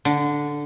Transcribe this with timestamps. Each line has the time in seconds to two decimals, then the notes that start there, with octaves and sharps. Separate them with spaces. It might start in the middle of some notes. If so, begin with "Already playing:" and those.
0.05 D3